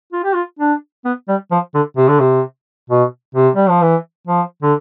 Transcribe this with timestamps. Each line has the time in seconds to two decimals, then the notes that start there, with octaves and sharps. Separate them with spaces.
0.13 F4
0.24 G4
0.34 F4
0.59 D4
1.05 B3
1.29 G3
1.51 F3
1.75 D3
1.97 C3
2.09 D3
2.20 C3
2.90 B2
3.35 C3
3.56 G3
3.69 F3
3.82 E3
4.27 F3
4.62 D3